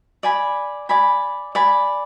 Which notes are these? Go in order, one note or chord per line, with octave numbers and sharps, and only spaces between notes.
D5 G#5 B5
D5 G#5 B5
D5 G#5 B5